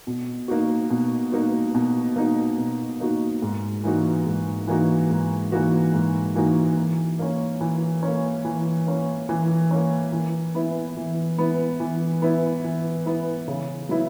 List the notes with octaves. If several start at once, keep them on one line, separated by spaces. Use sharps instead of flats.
B2
A#3 D#4 F#4
B2
A#3 D#4 F#4
B2
A#3 D#4 F#4
B2
A#3 D#4 F#4
G#2
E3 A#3 D#4 F#4
G#2
E3 A#3 D#4 F#4
G#2
E3 A#3 D#4 F#4
G#2
E3 A#3 D#4 F#4
E3
A#3 C#4
E3
C#4
A#3
E3
A#3 C#4
E3
A#3 C#4
E3
B3 E4
E3
B3 E4
E3
B3 E4
E3
B3 E4
C#3
F#3 B3 E4